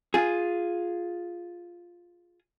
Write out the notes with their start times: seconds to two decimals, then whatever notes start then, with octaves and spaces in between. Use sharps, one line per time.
0.14 F4 G#4